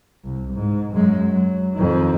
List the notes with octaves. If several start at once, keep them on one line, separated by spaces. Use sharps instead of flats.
C2
G#2
F#2 G#3
F#3
F2 D#3